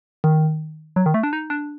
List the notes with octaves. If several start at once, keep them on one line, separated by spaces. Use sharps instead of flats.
D#3
F#3
D#3
A3
D4
D#4
D4